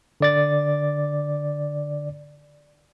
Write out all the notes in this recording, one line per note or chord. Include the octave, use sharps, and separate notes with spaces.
D3 D5 A6